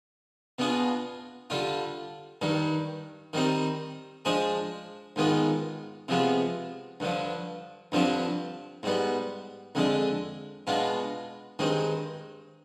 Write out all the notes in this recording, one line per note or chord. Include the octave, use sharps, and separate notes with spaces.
B2 B3 D4 F4 G#4
D3 G3 D4 F4
G2 D#3 G3
D#3 G3 C4 D#4
F3 G#3 D4 G#4 C5
G#2 D#3 G#3 B3 F4
C3 F3 G#3 B3 F4
G2 D3 F3
G2 D3 F3 C4 G4
G#2 G3 B3
F2 D3 G#3 D4
B2 G#3 B3 D4 F4
G2 D#3 G#3 C4